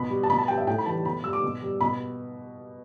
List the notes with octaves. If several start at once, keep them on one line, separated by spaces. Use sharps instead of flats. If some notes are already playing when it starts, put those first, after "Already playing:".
Already playing: B2 B5
G3
A5
B2 B5
A5
G3 G5
E5
A2 G5
B5
E3 G3 A5
B2 B5
G3 E6
D6
B2
G3
B2 B5